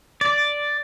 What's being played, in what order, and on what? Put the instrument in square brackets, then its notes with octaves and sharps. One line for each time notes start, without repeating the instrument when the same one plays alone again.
[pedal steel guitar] D5